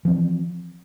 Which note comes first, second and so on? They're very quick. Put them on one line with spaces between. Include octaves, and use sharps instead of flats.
F3 C4 E3